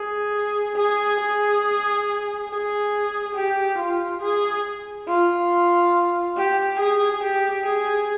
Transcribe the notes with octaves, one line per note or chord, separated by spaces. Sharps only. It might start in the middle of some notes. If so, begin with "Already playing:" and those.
Already playing: G#4
G#4
G#4
G#4
G4
F4
G#4
F4
G4
G#4
G4
G#4